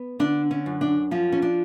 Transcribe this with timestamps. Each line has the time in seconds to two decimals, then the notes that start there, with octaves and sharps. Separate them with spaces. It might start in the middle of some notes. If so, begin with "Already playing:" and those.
Already playing: B3
0.19 D3 D4
0.51 C#4
0.66 F#2
0.81 D4
1.11 F3 C#4
1.32 C#4
1.42 D4